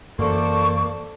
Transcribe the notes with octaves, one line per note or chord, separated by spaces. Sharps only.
F#2 E3 A#3 A4 C5 D5 C#6